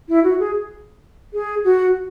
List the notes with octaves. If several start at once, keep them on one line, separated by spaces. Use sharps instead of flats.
E4
F#4
G#4
G#4
F#4